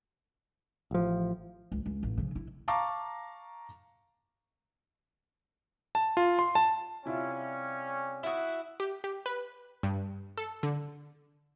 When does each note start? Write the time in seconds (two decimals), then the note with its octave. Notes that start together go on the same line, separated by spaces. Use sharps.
0.91 A1 F3
1.72 C#2
1.86 C#2
2.03 A1
2.18 C#3 F3
2.35 E4
2.68 F5 A5 A#5 C#6 D6
5.95 A5
6.17 F4
6.39 C6
6.55 A5
7.06 C3 G3 C#4 E4 F4
8.23 E4 F#4 E5 C#6 D#6
8.80 G4
9.04 G4
9.26 B4
9.83 G2
10.38 A4
10.63 D3